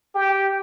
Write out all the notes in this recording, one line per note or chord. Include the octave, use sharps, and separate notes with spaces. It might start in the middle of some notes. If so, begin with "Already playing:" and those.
G4